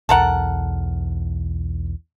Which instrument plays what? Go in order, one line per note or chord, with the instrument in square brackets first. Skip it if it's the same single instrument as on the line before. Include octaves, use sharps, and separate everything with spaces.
[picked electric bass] B1 E2 [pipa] A4 A#4 F#5